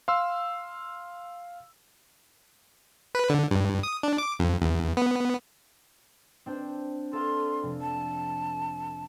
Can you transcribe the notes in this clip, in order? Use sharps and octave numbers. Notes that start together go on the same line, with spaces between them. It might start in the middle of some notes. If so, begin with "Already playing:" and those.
F5 C6 E6
B4
D3
G2
D#6
D4
D6
F2
E2
B3
C4 D4 C5
A4 D5 F5 C6
F1
A5